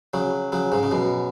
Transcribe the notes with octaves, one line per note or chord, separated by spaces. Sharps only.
C#3 F#3
C#3 F#3
G#2 C#3
C#3
F#2 B2